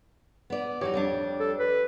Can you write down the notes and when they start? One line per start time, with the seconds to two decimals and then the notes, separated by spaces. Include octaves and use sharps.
0.50 B3 D5
0.81 E3 F#3 D#4 G4 C#5 D6
0.94 F2 G3 D4
1.40 A4
1.59 B4